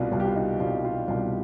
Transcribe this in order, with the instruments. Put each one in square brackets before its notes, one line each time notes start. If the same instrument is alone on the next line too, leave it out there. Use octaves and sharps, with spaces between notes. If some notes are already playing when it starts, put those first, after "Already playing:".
Already playing: [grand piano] C2 B2 G3 F4
C2 B2 G3 F4
G4
F4
D#4
C2 B2 G3 F4
F4
C2 B2 G3 F4